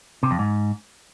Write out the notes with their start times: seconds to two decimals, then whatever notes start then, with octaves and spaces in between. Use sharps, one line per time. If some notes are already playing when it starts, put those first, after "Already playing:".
0.23 C3
0.31 F2
0.39 G#2